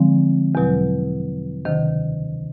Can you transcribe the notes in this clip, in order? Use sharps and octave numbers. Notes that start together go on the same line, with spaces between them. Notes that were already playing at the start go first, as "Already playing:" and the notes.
Already playing: D3 F3 G#3 C4
E2 B2 F#3
D2 C3 D#3